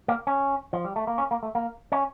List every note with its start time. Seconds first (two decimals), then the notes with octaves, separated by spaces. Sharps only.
0.08 A#3
0.27 C#4
0.73 F3
0.85 G3
0.96 A3
1.07 A#3
1.18 C#4
1.31 A#3
1.43 A3
1.55 A#3
1.92 C#4